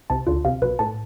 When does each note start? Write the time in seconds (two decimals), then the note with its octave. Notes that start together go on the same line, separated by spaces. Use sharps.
0.10 C2 C3 A5
0.27 D2 D3 F4
0.45 C2 C3 F5
0.62 B1 B2 B4
0.79 A2 A5